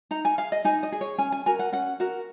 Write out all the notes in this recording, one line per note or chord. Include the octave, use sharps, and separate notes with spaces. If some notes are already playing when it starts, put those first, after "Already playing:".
D#4 A#5
G#5
G#4 F5
D#5
D#4 G#5
D#5
G#4
C#5
C#4 G#5
G#5
F#4 A#4 G#5
F#5
C#4 F#5
F#4 A#4 F#5